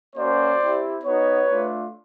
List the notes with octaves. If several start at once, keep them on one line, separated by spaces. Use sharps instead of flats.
A#3 C#4 F#4 C5 D5
C4 E4 G4
B3 D#4 F#4 B4 C#5
A3 D4 F4